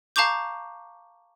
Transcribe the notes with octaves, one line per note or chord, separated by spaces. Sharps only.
F5 A5 A#5 C#6 D6 G6